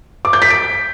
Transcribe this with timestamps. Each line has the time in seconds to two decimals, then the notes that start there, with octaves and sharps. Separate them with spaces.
0.25 D6
0.33 G6
0.42 B6
0.50 D7